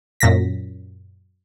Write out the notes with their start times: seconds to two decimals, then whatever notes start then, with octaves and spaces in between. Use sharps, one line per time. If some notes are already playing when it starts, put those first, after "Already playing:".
0.20 F#2 A#2 A#6 B6